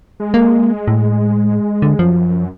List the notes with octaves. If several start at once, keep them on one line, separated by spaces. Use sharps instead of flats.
G#3
A#3
A2
D3
F#2 F3